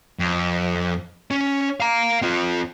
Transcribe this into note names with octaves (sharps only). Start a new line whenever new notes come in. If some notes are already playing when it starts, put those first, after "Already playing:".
F2
C#4
F5 A#5
C4 F4